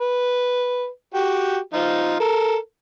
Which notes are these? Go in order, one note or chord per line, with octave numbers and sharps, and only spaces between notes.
B4
F#4 G4 G5
F3 D#4 F4
A4 A#4